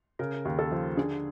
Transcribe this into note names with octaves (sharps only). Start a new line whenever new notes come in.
C#3 A#4
D#2
A4
F3
D3 G#4